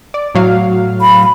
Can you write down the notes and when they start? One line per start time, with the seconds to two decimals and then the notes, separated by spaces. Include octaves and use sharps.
0.14 D5
0.35 A2 F#3 F5
1.01 B5